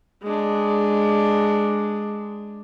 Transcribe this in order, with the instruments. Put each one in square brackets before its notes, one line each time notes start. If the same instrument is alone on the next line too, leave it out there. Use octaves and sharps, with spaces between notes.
[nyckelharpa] G#3 D4